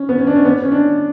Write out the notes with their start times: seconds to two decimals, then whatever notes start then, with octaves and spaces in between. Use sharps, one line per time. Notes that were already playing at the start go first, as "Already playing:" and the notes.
Already playing: C#4
0.09 B3
0.18 C#4
0.27 D4
0.36 C#4
0.45 B3
0.62 C#4
0.72 D4